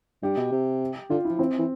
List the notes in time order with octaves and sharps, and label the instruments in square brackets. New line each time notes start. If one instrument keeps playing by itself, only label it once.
[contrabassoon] G2 [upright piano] G4
[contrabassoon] B2
C3
[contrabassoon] D3 [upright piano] F4
[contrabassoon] F3 [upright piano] E4
[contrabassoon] E3 [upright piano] C4
[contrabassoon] E3